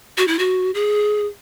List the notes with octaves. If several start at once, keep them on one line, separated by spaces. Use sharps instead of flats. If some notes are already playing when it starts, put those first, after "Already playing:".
F#4
E4
F#4
G#4